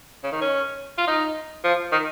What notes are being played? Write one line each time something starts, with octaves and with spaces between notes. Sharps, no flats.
C#3
D#3
C#4
F4
D#4
F3
D#3